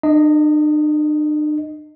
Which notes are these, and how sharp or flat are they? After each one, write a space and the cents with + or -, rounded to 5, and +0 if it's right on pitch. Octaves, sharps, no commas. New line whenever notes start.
D4 +45 D#5 +0